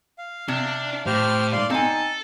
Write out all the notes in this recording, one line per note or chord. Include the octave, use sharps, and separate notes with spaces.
F5
C3 D4
A2 G4 C5 F6
D5 F5 C6
C4 D#4 A4 G#5